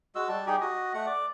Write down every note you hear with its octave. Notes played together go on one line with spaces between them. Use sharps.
G#3 F#4 E6
G3 A5
G3 D#4 G4 G#4
F#4 D#5
A3 F#5
D5